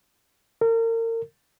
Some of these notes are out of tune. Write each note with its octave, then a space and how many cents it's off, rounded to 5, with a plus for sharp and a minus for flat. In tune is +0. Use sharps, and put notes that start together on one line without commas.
A#4 -35